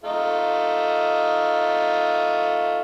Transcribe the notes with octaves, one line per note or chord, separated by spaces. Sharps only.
A3 D#4 F4